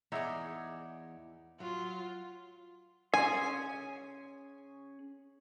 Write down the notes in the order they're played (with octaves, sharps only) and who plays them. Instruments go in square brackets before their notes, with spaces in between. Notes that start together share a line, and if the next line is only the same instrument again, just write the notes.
[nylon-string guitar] E2 [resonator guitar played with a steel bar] E3 G#4 D5 [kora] D#4 C#5 E5
[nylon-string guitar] F#3 [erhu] F4
[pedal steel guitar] C#4 G#4 C6 [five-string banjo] G#5